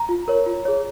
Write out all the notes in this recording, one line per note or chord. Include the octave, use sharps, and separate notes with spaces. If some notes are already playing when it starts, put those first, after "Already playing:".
Already playing: A#5
F4
A#4 C#5
F4
G#4 C#5